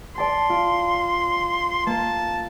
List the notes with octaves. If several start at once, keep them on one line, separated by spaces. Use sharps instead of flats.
D5 A5 C6 C7
F4 D7
A#3 A5